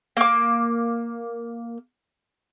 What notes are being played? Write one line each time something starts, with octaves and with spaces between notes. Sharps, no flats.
A#3 D6